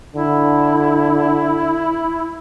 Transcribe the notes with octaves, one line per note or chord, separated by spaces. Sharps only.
D3 E4